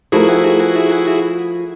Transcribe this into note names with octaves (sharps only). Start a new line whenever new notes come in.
F3 A3 E4 F#4 G#4 A#4